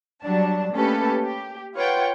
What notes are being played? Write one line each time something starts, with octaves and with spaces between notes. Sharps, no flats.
F#3 G3 D4 A5
A3 A#3 C#4 G4 A4 B4
G4
F4 B4 C#5 F#5 G5